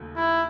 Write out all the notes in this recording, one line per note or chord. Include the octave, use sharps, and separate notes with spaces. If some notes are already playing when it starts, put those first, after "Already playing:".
Already playing: D#2 C#3 F#3 A3
E4